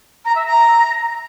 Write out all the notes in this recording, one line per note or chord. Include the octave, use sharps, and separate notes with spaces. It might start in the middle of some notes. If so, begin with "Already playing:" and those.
A#5
E5
A#5